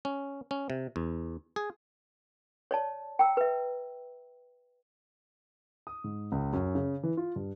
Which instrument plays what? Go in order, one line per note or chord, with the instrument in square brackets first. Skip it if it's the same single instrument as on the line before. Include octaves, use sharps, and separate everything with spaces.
[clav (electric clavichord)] C#4
C#4
C3
E2
G#4
[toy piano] C#5 D5 A5
G5 A#5 E6
B4 E5
[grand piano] D#6
G#2
C#2
F#2
C#3
E3
F4
G2